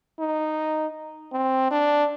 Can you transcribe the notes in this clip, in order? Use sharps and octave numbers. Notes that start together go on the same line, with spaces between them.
D#4
C4
D4